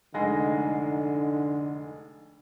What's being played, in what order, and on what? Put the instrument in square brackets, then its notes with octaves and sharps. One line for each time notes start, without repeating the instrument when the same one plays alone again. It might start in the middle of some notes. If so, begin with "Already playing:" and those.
[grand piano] F1 G#3 A#6 [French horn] D3 [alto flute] D#4 [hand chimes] F#5 G#5 C7